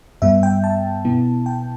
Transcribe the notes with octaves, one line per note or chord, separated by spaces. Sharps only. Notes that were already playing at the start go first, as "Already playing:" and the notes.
G2 G3 B3 E5
G5
A5
B2 B3 E4
G5